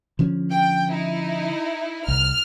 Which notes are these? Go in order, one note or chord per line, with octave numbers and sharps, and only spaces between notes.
D3 F3 C#4
G5
D#4 E4
C2 F6